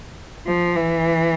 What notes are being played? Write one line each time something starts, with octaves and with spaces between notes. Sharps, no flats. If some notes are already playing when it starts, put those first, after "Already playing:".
F3
E3